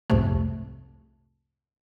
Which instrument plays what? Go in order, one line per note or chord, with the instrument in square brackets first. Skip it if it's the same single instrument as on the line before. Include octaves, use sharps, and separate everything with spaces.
[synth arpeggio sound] C2 F2 G#2 C3 A3